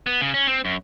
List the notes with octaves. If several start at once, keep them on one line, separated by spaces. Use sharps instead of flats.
B3
C#3
C#4
C4
F#2